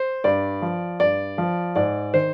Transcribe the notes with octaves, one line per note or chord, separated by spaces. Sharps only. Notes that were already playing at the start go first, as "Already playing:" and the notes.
Already playing: C5
G2 D5
F3
G2 D5
F3
G#2 D5
D#3 C5